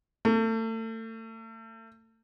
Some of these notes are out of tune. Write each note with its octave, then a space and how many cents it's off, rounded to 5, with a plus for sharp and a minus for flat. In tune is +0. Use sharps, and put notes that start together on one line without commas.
A3 +35